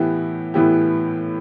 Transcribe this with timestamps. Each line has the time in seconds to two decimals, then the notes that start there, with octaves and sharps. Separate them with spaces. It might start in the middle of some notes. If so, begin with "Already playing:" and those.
Already playing: A2 E3 B3 E4 G4
0.54 A2 E3 B3 E4 G4